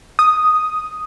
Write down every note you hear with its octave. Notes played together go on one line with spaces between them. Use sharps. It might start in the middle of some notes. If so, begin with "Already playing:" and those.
D#6